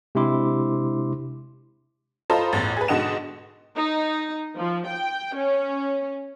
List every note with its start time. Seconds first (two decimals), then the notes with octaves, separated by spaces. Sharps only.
0.15 C3 G#3 D4 E4 C6 D6
2.30 F4 A4 C5 D#5 A#5 B5
2.53 A1 E2 A6
2.77 G#4 B4
2.88 G#2 B2 D3 D#5 F#5 E7
3.77 D#4
4.56 F3
4.87 G5
5.36 C#4